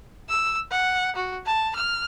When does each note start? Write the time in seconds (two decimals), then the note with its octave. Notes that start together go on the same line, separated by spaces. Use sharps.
0.29 E6
0.71 F#5
1.16 F#4
1.46 A5
1.75 F6